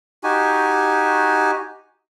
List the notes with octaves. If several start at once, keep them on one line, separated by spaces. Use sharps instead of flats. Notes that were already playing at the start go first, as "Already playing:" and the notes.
D#4 F#4 G4 G#5